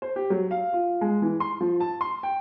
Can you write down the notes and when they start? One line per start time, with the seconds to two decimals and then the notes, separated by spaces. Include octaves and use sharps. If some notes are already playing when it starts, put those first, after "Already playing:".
0.02 C5
0.16 G4
0.30 F#3
0.51 F5
0.73 F4
1.01 G#3
1.22 E3
1.40 C6
1.61 F3
1.80 A5
2.01 C6
2.23 G5